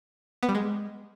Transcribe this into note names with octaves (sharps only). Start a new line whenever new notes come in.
B3
G3
G#3